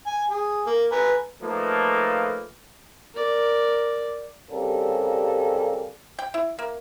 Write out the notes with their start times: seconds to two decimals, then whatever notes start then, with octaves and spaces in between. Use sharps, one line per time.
0.07 G#5
0.30 G#4
0.67 A#3
0.92 B4 G#5 A#5
1.42 F3 A3 A#3 D#4 B4
3.14 A#4 D5
4.50 C2 C#3 G3 A#3 C#4 A4
6.19 G5
6.34 E4
6.59 A#3